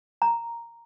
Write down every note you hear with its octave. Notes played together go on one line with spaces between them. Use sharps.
A#5